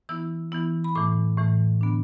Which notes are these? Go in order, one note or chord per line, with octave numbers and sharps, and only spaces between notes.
E3 B3 E4 E6
E3 B3 E4
B5
A2 E3 A3 D6
A2 E3 A3
D3 B3 D4